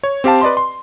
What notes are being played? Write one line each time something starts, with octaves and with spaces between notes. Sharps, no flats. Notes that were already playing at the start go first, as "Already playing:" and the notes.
C#5
C4 G4 F5 A5
B4 D5 D#5 C6
C6